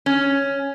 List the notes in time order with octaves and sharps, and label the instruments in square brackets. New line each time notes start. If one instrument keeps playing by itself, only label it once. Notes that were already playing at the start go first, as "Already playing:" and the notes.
[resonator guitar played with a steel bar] C#4